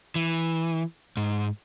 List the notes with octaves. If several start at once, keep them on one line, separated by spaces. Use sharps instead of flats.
E3
G#2